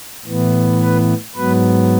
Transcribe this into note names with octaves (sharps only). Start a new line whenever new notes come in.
A2 E3 B3
B4
G#2 F#3 B3 B4